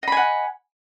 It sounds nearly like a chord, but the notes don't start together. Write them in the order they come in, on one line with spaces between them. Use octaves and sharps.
D#5 B5 G#5 F#5